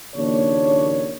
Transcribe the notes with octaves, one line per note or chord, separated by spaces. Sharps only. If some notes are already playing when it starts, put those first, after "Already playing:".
A#1 D#2 C#3 D4 C#5